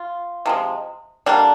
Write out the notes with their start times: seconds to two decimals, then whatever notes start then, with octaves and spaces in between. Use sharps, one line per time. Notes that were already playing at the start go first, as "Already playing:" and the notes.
Already playing: F4
0.46 C3 F3 G#3
1.26 D3 G3 A#3 D4